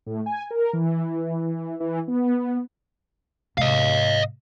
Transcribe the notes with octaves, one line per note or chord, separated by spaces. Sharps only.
A2
G#5
A#4
E3
E3
B3
G#2 C3 D#5 F5